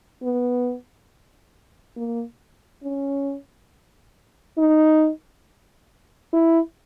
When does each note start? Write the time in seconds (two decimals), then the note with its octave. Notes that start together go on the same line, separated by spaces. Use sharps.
0.23 B3
1.97 A#3
2.83 C#4
4.58 D#4
6.33 E4